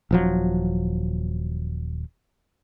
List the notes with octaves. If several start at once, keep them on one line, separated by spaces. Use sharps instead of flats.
D#1 F3 F#3